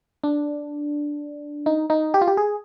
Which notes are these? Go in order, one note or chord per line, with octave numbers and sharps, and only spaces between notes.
D4
D#4
D#4
G4
F4
G4
G#4